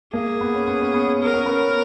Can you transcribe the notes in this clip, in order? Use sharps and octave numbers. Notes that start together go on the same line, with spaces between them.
A#3 G#4
B3
C#4
B3
C#4
B3
C#4
B3 A#4
C#4
B3